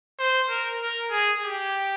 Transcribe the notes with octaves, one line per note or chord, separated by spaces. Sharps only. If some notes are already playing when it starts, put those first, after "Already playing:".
C5
A#4
A#4
G#4
G4